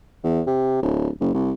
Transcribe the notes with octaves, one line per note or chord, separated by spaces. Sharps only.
E2
C3
D1
F#1
C2